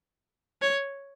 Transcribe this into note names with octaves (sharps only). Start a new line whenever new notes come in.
C#5